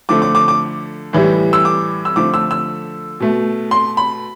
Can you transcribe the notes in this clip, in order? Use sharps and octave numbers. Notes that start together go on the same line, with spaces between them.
D3 F3 A3 D6
D6
D6
D6
A2 E3 G3
E6
D6
E6
D3 F3 A3 D6
E6
E6
B2 A3
C6
B5